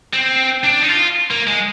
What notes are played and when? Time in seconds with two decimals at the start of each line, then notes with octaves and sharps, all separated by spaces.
0.13 C4
0.64 D4
0.82 D#4
0.89 F4
1.31 A#3
1.47 G#3